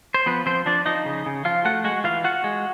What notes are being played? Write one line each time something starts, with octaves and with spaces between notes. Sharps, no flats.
C5
F3 B3 B4
F3 C4 C5
F3 D4 D5
F3 D#4 D#5
C#3
C#3
F3 F4 F5
A3 F#4 F#5
G#3 F#4 F#5
E3 F4 F5
F4 F#4 F#5
G#3